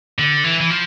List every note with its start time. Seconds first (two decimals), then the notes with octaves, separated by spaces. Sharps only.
0.19 D3
0.44 E3
0.60 E3
0.70 F3